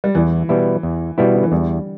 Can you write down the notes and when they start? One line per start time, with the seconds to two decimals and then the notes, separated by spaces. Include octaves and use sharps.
0.04 G3
0.15 E2 E3
0.49 B2 G3 B3 E4
0.83 E2
1.18 B2 G3 B3 E4
1.35 D3
1.43 E3
1.52 E2 G3